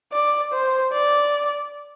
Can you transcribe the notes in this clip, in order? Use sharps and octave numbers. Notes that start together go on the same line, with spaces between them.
D5
C5
D5